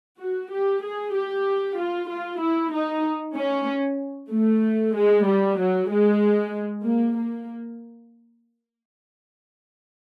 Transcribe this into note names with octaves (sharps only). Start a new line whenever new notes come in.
F#4
G4
G#4
G4
F4
F4
E4
D#4
C#4
A3
G#3
G3
F#3
G#3
A#3
A#3